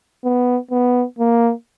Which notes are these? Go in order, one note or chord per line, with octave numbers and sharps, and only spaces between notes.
B3
B3
A#3